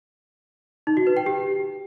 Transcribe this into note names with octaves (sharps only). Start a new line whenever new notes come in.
D#4
F#4
B4
G5
G4